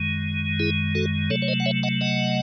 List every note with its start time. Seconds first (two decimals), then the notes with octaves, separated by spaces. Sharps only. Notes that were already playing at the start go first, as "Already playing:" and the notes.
Already playing: F#2 D#3 G#3
0.60 E4 G#4
0.95 F#4 A4
1.30 C3 F#3 A3 A4 C#5
1.42 C#5
1.48 C5 D#5
1.60 F#5
1.66 C#5 E5
1.83 D#5 F#5
2.01 D#5 F#5